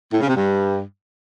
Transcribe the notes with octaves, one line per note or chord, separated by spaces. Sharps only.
A2
C#3
C3
G2